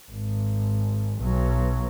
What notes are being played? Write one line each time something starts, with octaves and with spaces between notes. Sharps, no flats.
G#1
B1 F#3